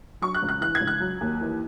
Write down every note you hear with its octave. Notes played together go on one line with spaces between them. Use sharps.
F#3 C#6
F#6
C#2
F#6
E3 F#6
G#6
C#2
F#6
F#3
D#2
E3